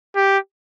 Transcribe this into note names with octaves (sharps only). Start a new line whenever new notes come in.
G4